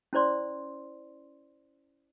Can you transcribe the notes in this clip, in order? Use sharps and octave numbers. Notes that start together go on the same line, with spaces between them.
C#4 E4 C5 D5 C6